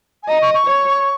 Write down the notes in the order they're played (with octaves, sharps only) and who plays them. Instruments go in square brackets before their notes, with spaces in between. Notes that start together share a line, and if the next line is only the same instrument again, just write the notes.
[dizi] G#5
[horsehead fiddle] D#5 [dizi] A#5
[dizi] C#6
C#6
[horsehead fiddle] C#5